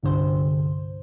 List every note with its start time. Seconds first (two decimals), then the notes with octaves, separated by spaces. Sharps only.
0.03 C2 G2 D3 C5